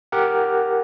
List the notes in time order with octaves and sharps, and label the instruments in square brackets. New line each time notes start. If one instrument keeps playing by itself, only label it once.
[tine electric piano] G4 A#4 F#5